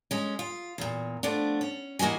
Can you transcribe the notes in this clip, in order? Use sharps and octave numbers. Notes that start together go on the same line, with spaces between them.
G#3 C#4
F4
E2 A#2
F3 A3 B3 D4
C#4
E3 A#3 F#4 D#5 G#5